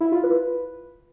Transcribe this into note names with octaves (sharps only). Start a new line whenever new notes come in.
E4
F4
B4